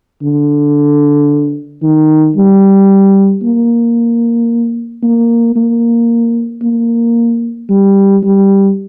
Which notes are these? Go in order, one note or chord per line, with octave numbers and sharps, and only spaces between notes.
D3
D#3
G3
A#3
A#3
A#3
A#3
G3
G3